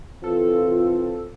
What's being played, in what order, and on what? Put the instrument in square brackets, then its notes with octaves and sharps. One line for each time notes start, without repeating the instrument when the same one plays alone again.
[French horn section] E3 C4 F4 [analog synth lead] A4